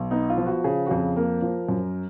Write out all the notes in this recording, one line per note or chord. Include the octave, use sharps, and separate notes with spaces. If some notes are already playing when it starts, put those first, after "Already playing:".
Already playing: B1
B3 D#4
F4
F3
F#4
C#3 G#4
F#4
F2 G#4
A#3 A#4
F3
F#2